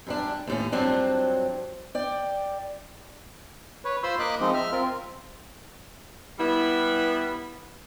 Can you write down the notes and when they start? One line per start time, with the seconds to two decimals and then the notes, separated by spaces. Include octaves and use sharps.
0.07 F#2 G3 D4
0.47 D#2 A2 C#4
0.72 G2 F3 F#3 C4 D4
1.95 D5 G5
3.85 B4 C#5
4.03 F4 C5 B5 C6 E6
4.19 A#3 A#4 D#5 B5 D6 F#6
4.40 F3 G#3 C4 D#4 D#5
4.54 E5 F6
4.72 C4 F4 A#4
6.39 G3 B3 E4